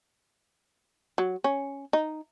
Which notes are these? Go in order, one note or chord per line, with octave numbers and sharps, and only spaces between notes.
F#3
C#4
D#4